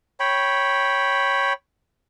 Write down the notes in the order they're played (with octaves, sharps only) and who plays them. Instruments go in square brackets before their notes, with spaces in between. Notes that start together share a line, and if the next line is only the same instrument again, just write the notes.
[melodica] C#5 G5 B5